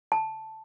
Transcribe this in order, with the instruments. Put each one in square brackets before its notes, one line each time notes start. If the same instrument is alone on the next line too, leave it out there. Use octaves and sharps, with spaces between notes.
[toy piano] A5